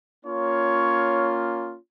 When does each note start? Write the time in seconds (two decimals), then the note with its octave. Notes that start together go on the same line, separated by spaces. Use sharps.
0.24 A#3 C#4 F4 C#5